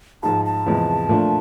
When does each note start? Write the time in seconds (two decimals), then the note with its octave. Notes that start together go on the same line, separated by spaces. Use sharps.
0.23 G#2 F3 G#3 A5
0.45 A5
0.66 E2 C3 F3 G#3
1.08 A#2 F3 A3 D4 F4